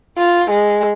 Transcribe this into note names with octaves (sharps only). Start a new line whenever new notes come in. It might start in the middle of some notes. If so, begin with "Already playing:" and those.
F4
G#3